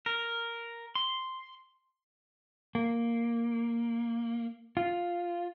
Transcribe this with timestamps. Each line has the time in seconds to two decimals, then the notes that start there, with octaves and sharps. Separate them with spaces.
0.06 A#4
0.95 C6
2.75 A#3
4.77 F4